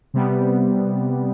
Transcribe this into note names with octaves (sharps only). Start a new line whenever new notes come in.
C3 G3 B3